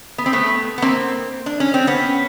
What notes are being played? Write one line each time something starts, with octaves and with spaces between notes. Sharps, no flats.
B3
C4
A3 B3
B3
A#3 C4
D4
C#4
C4
B3 C#4